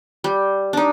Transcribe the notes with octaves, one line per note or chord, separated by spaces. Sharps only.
G3
D4 D#4